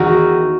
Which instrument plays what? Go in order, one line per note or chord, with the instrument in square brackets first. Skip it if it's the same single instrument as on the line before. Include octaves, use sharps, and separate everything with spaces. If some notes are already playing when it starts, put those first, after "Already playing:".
Already playing: [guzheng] E2 D#3 F#4 A#4